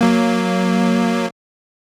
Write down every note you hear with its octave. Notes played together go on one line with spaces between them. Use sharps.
F#3 A#3